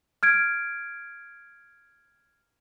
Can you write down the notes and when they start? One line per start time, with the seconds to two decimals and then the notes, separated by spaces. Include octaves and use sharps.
0.23 F6 G#6 D7